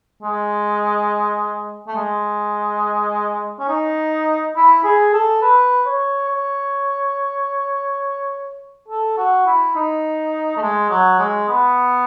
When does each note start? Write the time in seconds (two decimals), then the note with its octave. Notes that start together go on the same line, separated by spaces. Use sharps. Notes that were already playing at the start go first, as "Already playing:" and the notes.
0.22 G#3
1.87 A3
1.96 G#3
3.60 C#4
3.69 D#4
4.56 E4
4.84 G#4
5.14 A4
5.42 B4
5.86 C#5
6.28 C#5
8.88 A4
9.18 F#4
9.46 E4
9.75 D#4
10.57 A3
10.62 G#3
10.90 F#3
11.19 G#3
11.48 B3